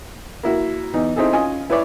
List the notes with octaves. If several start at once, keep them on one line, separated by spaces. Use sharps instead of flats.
A#3 E4 F#4
E2 E3 D#4
C4 D#4 E4 G#4 A4
C#4 F4 D#5 G#5
E4 B4 C#5 D5 E5